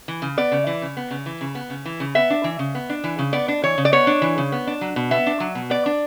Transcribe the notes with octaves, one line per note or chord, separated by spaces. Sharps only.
E3
C#3
B3 D5
C#3
E3
C#3
B3
C#3
E3
C#3
B3
C#3
E3
C#3
B3 E5
D4
E3
C#3
B3
D4
E3
C#3
B3 D5
D4
E3 C#5
C#3
D5
B3 C#5
D4
E3
C#3
B3
D4
F#3
B2
B3 E5
D4
F#3
B2
B3 D5
D4